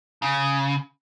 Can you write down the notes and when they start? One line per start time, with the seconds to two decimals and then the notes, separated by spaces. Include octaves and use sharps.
0.22 C#3